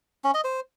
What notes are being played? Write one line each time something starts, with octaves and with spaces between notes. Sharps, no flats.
C#4
D#5
C5